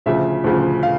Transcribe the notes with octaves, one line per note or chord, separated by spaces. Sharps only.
D2 C#3 F3 E5
D2 C#3 F3
F5